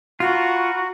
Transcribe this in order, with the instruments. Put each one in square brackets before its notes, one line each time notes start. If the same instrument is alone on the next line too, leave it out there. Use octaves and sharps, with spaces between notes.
[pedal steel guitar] F4 [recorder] F#4 [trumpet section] A#5 B5 C#6